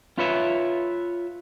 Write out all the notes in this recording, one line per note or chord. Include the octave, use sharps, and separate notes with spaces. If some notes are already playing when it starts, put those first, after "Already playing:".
F4 B4 C#5 E5